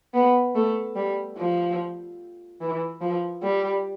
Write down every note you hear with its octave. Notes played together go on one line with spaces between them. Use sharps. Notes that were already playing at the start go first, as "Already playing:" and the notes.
B3
A3
G3
F3
E3
F3
G3